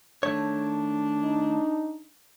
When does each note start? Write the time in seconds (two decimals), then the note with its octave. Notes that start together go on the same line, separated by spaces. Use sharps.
0.23 D#3 A3 D4 C#5
1.24 D#4